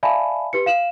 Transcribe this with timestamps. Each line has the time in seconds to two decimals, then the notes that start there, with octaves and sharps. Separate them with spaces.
0.03 D5 E5 F5 G#5 A5 B5
0.53 G4 B4 C#7
0.66 F5 E7 F#7